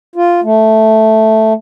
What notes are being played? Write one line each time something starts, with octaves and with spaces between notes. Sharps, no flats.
F4
A3